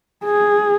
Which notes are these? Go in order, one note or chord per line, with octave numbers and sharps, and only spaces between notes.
G#4